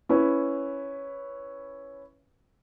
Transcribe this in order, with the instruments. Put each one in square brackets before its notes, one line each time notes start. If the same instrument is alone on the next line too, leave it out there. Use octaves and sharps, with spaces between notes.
[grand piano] C#4 E4 B4